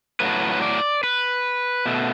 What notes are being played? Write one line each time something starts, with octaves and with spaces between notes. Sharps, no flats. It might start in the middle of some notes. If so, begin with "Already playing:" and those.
A2 F#3 A3 B4
B4
D5
B4
B2 A3